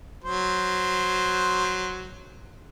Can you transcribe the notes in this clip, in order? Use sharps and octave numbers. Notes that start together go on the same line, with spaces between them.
F#3 C5